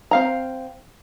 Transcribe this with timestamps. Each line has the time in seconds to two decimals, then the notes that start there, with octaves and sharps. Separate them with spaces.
0.11 C4 F5 A#5